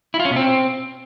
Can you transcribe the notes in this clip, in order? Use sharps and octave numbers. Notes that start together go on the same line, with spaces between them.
E4
F4
C#4
B2
C4